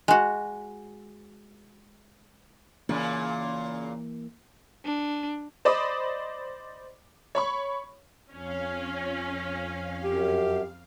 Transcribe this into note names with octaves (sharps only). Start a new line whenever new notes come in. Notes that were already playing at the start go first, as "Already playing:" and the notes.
G#3 F#4
A#2 C#3 E3 A#3
D4
C5 D5 D#5 B5 D6 D#6
C#5 B5 C#6
F2 C#4 F5
F#2 G4